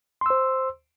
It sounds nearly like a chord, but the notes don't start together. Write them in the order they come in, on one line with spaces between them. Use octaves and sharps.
C6 E6 C5